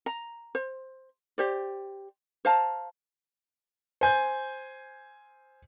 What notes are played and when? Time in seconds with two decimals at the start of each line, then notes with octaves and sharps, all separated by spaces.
0.06 A#5
0.55 C5
1.38 G4 C5 D5
2.45 C5 F5 A5 A#5
4.01 C5 G#5 G6